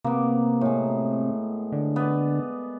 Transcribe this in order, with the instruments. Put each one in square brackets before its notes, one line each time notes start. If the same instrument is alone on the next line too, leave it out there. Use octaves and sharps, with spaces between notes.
[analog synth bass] C3 [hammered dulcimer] A#3 B3
[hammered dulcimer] A2 G#3
[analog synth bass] D3
[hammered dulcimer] B3 D5